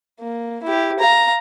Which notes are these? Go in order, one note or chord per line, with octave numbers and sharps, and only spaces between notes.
A#3
E4 G4
F5 A#5